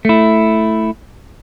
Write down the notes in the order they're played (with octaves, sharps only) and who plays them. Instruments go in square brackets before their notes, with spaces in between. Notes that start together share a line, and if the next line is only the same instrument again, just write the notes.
[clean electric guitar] A3 E4